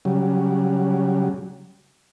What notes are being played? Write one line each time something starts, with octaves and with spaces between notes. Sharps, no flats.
C#3 F#3 G3